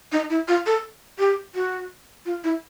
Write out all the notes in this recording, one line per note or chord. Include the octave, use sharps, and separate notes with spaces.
D#4
E4
F4
A4
G4
F#4
F4
E4